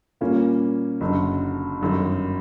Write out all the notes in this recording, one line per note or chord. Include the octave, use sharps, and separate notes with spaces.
A#2 G3 A#3 C#4 F4
F#1 F#2 D3
G1 F#2 D#3